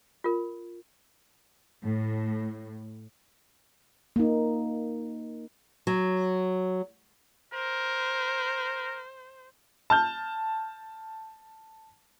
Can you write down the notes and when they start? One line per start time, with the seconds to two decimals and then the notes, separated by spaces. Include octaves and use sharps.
0.24 F4 A#4
1.84 A2
4.16 A#3 D#4
5.87 F#3
7.53 A#4 C5
9.90 A5 F6 G6